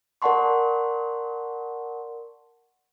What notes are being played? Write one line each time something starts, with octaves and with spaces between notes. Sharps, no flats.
A#4 D5 F#5 A5 C6 C#6